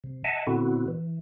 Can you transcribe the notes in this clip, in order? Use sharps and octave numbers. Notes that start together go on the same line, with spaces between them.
C3
D#5 E5 F#5 G#5 A5
A#2 D3 B3 C4 E4 F#4
E3